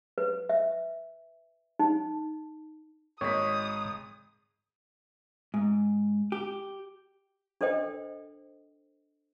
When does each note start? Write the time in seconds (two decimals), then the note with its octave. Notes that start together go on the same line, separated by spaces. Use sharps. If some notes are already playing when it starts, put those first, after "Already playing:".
0.18 B4
0.49 E5
1.79 D#4
3.21 G#1 G#3 C#5 D#6 B6
5.54 G#2
6.32 G4
7.61 D4 A4 A#4 C5 D#5 G5